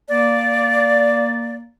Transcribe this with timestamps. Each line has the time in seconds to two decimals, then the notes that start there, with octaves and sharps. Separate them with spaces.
0.09 A#3 D5